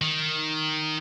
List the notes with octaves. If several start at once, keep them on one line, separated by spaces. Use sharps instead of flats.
D#3